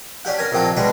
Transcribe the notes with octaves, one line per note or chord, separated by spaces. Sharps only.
C#4 D4 G4 F#5
C#4 A#4 G#5
A#1 F2 C3 A#3 F#4 A5
C2 B2 G#3 D4 B4 D6